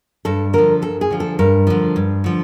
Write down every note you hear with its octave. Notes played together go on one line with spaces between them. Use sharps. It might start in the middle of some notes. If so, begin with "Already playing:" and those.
G2 A4
D3 F3 A#4
G2 A4
G#4
D3 F3
A4
G2 A#4
D3 F3
G2
D3 F3